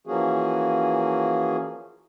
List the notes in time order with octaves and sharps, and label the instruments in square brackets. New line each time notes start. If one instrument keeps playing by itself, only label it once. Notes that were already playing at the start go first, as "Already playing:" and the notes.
[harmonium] E3 F3 A#3 C#4 F#4 G#4